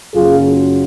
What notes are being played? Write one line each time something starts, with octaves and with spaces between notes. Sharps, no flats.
F#1 F#2 C#3 F#3 F4 G#4